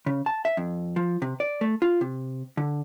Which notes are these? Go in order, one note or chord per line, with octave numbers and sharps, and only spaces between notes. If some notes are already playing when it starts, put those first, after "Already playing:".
C#3
A5
E5
F2
F3
C3
D5
A3
F4
C3
D3